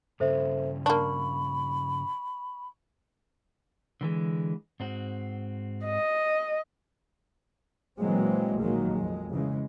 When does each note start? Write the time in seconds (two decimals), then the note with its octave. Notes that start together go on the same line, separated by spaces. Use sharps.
0.20 G2 C#3 A4 C5 E5
0.86 A#3 D4 B5 C#6
4.01 D3 E3 G#3
4.80 G#2 C4 F#4
5.85 D#5
7.98 A#2 E3 F#3 G#3 A#3 C4
8.60 A#1 A#2 D#3 F#3 G#3 A#3
8.93 F2 G#3
9.32 C#3 E3 G#3